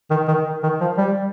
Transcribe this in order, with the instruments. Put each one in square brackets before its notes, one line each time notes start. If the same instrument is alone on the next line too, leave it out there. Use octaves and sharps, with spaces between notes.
[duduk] D#3
D#3
D#3
F3
G3